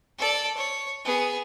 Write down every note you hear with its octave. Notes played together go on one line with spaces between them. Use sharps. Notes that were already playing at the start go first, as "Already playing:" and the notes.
A4 D5
C#5
B3 G#4